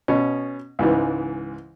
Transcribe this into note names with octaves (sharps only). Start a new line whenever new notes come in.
B2 C#4
C#2 G#2 E3